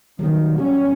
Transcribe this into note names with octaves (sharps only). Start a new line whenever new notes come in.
D#3 F#3 G3 A#3
C#4 G4